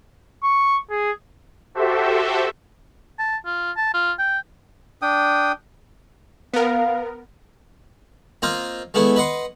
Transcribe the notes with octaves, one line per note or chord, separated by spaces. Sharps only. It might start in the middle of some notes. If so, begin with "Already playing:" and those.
C#6
G#4
F#4 G4 A4 C5 E5
A5
F4
A5
F4
G5
D4 G5 D#6
B3 A#4 F5
A#3 C4 F4 C5 D#5
G#3 A3 B3 E4
B4 D#5 F#5 C6